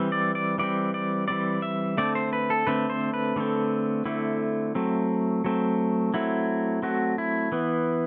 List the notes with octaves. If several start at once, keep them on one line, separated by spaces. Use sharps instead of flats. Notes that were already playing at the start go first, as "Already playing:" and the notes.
Already playing: E3 G3 C4
D5
D5
E3 G3 C4 D5
D5
E3 G3 C4 D5
E5
D3 A3 C4 D5
C5
B4
A4
D3 A3 C4 B4
C5
B4
D3 A3 C4
D3 A3 C4 E4
F#3 A3 C4
F#3 A3 C4
F#3 A3 C4 E4
F#3 A3 C4 F#4
E4
E3 B3